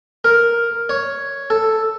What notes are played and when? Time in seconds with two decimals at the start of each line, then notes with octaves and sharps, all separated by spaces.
0.24 A#4
0.89 C#5
1.50 A4